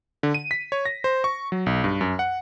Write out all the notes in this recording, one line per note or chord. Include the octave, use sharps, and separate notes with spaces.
D3
D#7
B6
C#5
A#6
C5
C#6
F#3
B1
G2
F#2
F#5